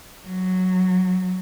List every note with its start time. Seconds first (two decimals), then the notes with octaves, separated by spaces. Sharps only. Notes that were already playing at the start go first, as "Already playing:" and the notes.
0.27 F#3